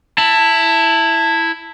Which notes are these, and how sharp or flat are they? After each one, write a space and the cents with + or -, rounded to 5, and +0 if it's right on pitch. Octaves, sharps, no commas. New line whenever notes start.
E4 +0 A5 +20